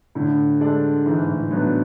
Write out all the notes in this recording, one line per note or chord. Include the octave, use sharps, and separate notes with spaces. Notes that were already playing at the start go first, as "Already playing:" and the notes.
A2 D3
G#3 D4 A4 D5
G#2 E3
A2
A2 F#3 B3 D4